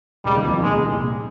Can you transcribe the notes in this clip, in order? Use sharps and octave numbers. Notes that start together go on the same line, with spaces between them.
C#2 C#3 G3
D#2 D#3
F2 F3
F2 F3
D#2 D#3 G#3
C#2 C#3
C2 C3
A#1 A#2